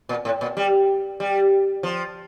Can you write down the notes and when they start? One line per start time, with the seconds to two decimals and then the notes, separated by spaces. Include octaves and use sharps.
0.09 A#2
0.25 A2
0.41 A#2
0.57 G3
1.20 G3
1.83 F3